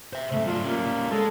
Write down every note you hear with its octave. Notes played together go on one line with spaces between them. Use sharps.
C5 E5
G#2 C#3 A3
F#3 D4 F4
G3 A#3 C#4
G#3 A4